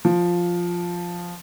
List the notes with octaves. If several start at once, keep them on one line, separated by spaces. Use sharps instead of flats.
F3